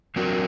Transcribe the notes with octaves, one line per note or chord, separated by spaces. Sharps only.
F#3 C4 F#4 A#4